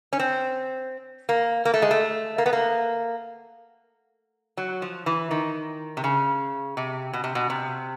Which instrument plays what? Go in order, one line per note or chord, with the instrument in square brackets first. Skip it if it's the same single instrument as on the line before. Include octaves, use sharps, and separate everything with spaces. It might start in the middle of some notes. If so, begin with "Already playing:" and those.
[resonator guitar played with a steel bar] C#4
C4
A#3
A#3
A3
G#3
A3
A#3
B3
A#3
F#3
F3
E3
D#3
C3
C#3
C3
B2
C3
B2
C3